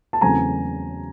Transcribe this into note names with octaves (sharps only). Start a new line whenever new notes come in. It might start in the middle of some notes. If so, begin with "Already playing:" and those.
A5
E2 C#3 F#3 A3 C4 G#5 A#5